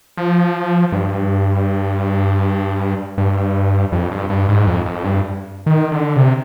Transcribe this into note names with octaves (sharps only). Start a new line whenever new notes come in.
F3
G2
G2
F2
G2
G2
G#2
F2
F2
G2
D#3
D3
C3